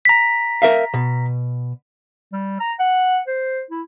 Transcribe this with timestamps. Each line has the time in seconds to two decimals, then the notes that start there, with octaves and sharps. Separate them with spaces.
0.05 A#5 B6
0.62 A#4 E5 F5
0.94 B2
2.33 G3
2.60 A#5
2.79 F#5
3.27 C5
3.71 E4